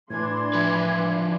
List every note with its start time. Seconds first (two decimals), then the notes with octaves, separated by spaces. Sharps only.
0.10 A2 E3 D4 C6 G#6
0.54 F3 B4